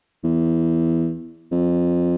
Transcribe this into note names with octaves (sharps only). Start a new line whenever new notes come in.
E2
F2